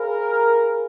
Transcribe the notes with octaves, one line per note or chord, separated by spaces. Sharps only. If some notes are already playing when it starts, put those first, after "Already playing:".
Already playing: G#4 A#4 C5 F5 G#5 B5